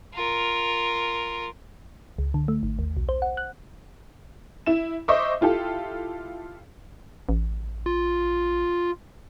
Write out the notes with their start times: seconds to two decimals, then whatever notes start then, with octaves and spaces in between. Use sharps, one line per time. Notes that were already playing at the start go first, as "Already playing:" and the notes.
0.14 F4 A#4
2.18 C#2
2.34 D3
2.48 A3
2.63 G#1
2.79 D#2
2.97 B1
3.09 C5
3.22 F#5
3.37 F#6
4.66 E4 E7
5.08 C5 D#5 E5 C#6 D6
5.41 E4 F4 G4 A4
7.29 A1
7.86 F4